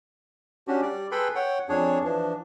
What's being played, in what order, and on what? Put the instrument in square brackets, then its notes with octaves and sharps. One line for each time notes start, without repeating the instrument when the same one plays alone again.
[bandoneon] C#4 D4 F#4 G4
G3 D5
G#4 A4 B4 G5 B5 C6
C#5 F#5 G5
F2 D4 G#4 C#5
E3 F3 D4